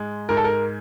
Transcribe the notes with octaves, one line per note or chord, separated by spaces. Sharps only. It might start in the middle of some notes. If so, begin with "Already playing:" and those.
Already playing: G#2 G#3
G#2 A#4
A4
A#4